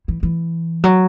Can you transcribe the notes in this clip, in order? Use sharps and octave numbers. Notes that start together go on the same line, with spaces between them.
E3
E3
F#3